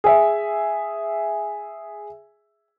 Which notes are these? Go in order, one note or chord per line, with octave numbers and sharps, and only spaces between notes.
G#4 E5